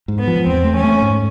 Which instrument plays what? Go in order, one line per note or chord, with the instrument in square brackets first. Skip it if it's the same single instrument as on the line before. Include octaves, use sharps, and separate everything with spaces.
[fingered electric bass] G#2
[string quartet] B3
[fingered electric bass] F3
[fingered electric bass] E2 [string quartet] C4
[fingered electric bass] A3
[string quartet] C#4
[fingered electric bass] A3
G#2